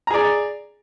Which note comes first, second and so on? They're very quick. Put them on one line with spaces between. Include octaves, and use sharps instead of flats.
A#5 G#4 D5